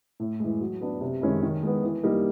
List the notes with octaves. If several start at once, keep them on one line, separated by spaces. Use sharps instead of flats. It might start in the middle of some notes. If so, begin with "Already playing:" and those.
A2
E3 G#3
F#3
B3 D4
C3
D#3 G#3 C#4 E4
D#3
G#3 B3
E3
G3 A#3 D#4